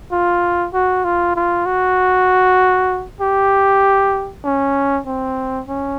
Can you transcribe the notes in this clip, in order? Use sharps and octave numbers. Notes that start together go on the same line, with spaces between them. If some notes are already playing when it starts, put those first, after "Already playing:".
F4
F#4
F4
F4
F#4
G4
C#4
C4
C#4